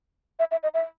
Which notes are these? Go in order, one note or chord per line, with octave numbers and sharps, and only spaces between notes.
E5
E5
D#5
E5